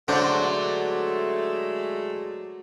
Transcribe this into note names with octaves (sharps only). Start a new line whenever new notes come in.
D3 F#3 G#3 A3 D4 C5 D5